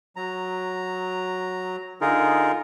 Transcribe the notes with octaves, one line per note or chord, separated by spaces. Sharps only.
F#3 A#5
D3 D#4 F4 G#4 A#4